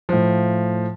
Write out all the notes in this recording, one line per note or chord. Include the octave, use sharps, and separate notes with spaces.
A2 F3